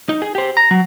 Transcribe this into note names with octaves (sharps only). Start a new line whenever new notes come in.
D#4
G#4
G4 C5
A#5
F#3